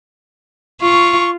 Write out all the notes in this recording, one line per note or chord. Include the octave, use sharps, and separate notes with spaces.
F4 C#6